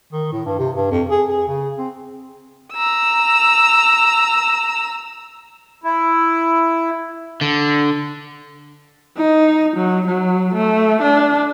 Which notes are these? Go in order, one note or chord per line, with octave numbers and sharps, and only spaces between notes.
D#3
A2
G2
C3
G2
F2
G#4
G#4
C#3
C4
A#5 E6
E4
D3
D#4
F#3
F#3
A3
D4